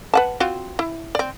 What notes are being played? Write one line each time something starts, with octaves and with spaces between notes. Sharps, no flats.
B4 F#5 A5
C4 F4 F#4
E4
C4 D5